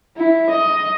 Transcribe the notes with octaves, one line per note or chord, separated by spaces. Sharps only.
E4
D#5